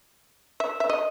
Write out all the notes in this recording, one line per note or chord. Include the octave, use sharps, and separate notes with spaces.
E5
E5
D#5